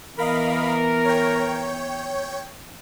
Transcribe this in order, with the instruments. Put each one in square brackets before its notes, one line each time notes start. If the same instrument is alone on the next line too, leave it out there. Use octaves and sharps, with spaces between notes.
[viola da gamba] E3 B3 [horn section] A#4 [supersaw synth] D#5 F5 B5
[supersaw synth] C#5 G5